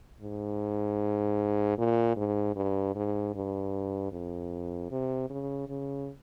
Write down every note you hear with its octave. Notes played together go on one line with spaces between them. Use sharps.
G#2
A#2
G#2
G2
G#2
G2
F2
C3
C#3
C#3